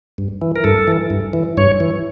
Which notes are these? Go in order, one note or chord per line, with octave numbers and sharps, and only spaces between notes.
G2
E3
A#4
G2 A4
E3
G2
E3
G2 C#5
E3